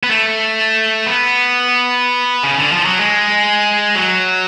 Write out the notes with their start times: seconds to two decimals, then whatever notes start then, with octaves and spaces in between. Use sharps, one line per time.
0.03 B3
0.10 A3
1.06 B3
2.43 C#3
2.58 D3
2.72 F3
2.85 F#3
2.99 G#3
3.95 F#3